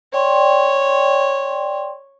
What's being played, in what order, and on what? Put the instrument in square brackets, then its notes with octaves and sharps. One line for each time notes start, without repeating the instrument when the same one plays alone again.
[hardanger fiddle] C#5 [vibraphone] D5 G5 C6